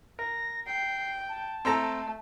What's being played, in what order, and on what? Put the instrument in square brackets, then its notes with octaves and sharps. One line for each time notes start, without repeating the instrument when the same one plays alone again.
[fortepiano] A#4 [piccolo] A#6
[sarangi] G5 [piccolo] C7
[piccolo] A5
[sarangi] A3 [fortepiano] C4 A4 A#5